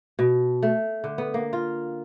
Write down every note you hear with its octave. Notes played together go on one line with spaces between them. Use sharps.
B2
A3
D3
B3
A#3
F4